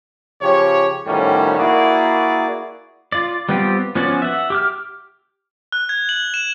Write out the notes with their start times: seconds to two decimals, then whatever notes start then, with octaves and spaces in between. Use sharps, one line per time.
0.42 C#3 F3 G4 C#5
1.06 A2 D#3 F3 G3 C#4 F#4
1.58 A#3 E4 F#4 G#4 D5
3.12 F4 D5
3.49 G3 B3 C4 F4 G4
3.95 F3 B3 C#4 F#4 D5
4.22 E5 F#5
4.50 G4 D6 F6
5.72 F#6
5.89 G#6
6.09 F#7
6.34 E7